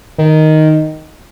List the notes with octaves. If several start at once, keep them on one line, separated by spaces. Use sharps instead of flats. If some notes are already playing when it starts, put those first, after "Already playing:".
D#3